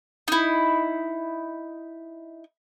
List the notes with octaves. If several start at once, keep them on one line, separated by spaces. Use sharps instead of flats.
D#4 E4